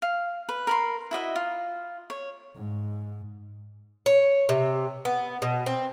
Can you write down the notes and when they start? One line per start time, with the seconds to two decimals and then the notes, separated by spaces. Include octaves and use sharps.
0.02 F5
0.49 B4
0.67 A#4 B5 C6
1.11 E4 F#4 D#5 E5
1.36 F4
2.10 C#5
2.56 G#2
4.06 C#5
4.49 C3
5.05 B3
5.42 B2
5.66 C4